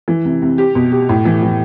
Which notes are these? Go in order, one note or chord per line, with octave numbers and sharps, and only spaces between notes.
E3
C3
C3
G4
B2
G4
A2
E3
E3